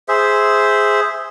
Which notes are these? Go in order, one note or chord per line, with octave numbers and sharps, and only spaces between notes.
G#4 C5 E5